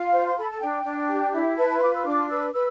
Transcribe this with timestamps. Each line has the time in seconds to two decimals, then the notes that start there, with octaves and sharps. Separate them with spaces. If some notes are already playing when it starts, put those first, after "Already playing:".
Already playing: F4 F5
0.11 C5
0.27 C6
0.37 A4 B5
0.49 A5
0.60 D4 G5
0.84 D4
1.09 G4
1.33 E4
1.57 B4 A5
1.69 A5
1.77 C6
1.82 F4 D6
1.94 E6
2.05 D4 D6
2.29 B4 E6
2.53 B4 E6